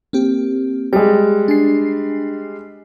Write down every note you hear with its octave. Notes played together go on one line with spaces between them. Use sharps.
A#3 C4 G4
G3 G#3 G5
D4 G#5 C7